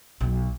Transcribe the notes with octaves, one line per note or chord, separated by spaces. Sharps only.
B1